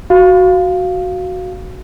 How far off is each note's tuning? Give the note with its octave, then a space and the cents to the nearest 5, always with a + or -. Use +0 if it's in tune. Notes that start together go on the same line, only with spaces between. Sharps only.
F#4 +0 F5 +0